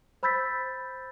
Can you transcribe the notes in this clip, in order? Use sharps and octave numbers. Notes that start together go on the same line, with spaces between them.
C5 B5 E6 G6 A6 B6